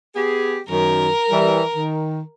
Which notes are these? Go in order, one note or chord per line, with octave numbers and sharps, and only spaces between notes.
B3 G4 G#4
F#2 D#3 A#4
E3 G3
D#3